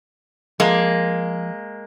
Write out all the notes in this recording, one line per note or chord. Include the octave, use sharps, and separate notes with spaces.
F3 G#3 A#3 A5